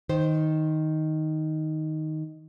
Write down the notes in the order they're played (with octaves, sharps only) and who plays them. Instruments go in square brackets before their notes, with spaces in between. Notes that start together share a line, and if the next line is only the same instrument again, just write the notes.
[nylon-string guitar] D#3 C5